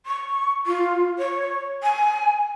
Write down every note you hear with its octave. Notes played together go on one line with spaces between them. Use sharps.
C#6
F4
C#5
G#5